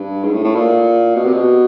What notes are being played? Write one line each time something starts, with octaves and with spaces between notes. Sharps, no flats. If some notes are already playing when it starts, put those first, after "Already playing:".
Already playing: G2
G#2
A2
A2
A#2
B2
C3
B2